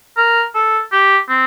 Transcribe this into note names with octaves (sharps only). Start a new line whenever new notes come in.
A#4
A4
G4
C4